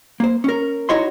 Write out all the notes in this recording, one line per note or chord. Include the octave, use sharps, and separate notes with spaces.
A#3 C5
C#4 A#4
D#4 E4 F#4 C#5 D#5 C6